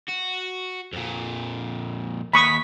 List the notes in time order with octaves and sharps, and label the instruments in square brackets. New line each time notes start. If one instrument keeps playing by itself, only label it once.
[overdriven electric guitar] F#4
F2 A#2
[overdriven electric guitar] D#2 [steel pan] B5 C#6 D#6 [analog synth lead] B6